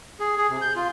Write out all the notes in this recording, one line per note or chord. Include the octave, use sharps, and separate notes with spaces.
G#4
G#4
C3
G6
F4